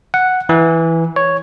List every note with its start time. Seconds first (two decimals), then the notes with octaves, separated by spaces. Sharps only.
0.14 F#5
0.49 E3
1.16 C#5